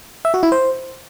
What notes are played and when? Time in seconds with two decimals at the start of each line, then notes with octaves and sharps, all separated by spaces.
0.25 E5
0.34 F#4
0.43 E4
0.52 C5